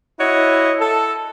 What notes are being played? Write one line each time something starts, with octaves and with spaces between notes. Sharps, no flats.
E4 F#4 C#5 D#5
A4